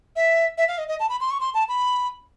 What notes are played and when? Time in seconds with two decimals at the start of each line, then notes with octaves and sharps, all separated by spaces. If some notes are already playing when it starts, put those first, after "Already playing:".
0.16 E5
0.58 E5
0.68 F5
0.78 D#5
0.88 D#5
1.00 A5
1.09 B5
1.20 C6
1.31 C#6
1.40 C6
1.54 A5
1.69 B5